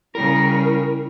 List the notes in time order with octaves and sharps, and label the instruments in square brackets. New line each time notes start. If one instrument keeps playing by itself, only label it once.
[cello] C#3 G3 [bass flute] E4 [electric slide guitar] A#4